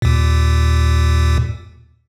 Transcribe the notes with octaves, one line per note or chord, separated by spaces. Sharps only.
D#2 A#2